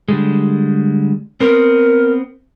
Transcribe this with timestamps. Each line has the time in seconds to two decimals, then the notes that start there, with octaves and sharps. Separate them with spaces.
0.08 D3 G3 G#3
1.40 B3 C4 A#4